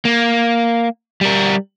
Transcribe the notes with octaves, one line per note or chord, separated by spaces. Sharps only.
A#3
G3 A#4